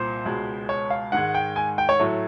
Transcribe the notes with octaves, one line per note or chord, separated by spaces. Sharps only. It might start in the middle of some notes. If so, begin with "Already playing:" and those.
Already playing: C2 A#2 C5
C#2 B2 G#3
C#5
F5
G#2 D#3 G#3 F#5
G5
G#5
G5
C#5
A2 F#3 A3